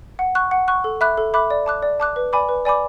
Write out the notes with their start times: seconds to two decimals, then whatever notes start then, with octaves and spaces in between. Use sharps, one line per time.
0.19 F#5
0.35 C#6 F#6
0.51 F#5
0.68 C#6 F#6
0.84 A4
1.01 E5 B5 D6 F#6
1.18 A4
1.34 E5 B5 D6 F#6
1.50 D5
1.66 A5 D6 F#6
1.83 D5
2.00 A5 D6 F#6
2.16 B4
2.33 D5 G#5 B5 D6
2.49 B4
2.65 D5 G#5 B5 D6